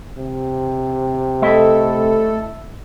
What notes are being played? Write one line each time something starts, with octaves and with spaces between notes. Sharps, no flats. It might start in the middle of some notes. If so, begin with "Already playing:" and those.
C3
A3 E4 A4 D#5 E5